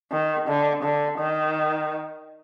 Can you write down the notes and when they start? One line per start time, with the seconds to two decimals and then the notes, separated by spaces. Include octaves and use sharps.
0.12 D#3
0.48 D3
0.83 D3
1.19 D#3